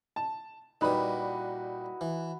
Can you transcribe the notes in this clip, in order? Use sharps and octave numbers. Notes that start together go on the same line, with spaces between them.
A5
A#2 G3 D#4 E4 F#4 B4 B5
E3